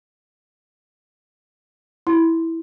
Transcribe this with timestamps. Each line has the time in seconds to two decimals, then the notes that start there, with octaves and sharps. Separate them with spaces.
2.07 E4